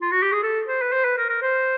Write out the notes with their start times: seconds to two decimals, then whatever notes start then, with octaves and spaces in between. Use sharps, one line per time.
0.02 F4
0.12 F#4
0.22 G4
0.32 G#4
0.43 A4
0.67 C5
0.82 B4
0.92 C5
1.04 B4
1.18 A#4
1.29 A#4
1.42 C5